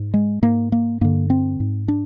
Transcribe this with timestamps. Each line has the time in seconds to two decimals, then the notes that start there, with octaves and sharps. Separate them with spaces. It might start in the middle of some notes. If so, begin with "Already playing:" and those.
Already playing: G#2
0.14 G#3
0.42 G#2 A#3
0.72 A#3
1.01 G2 D3 A#3
1.30 C4
1.60 G#2
1.88 D4